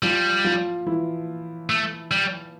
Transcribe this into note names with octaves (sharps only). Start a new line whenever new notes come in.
F3 G3 F4
F3 F4
E3 E4
A3
G3